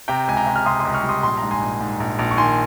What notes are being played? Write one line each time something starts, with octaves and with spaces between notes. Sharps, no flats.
C3 G5 A#5
C#2 G#5
G5 A#5
C3
F6
C3 C6 D#6
C#2 C6 D#6
C#6 F6
G3
C6 D#6
A#1 C6
G#2 A#5
G#5 C6
A#1
G#2
A#1
A#1
C#6
D#3 G#5 C6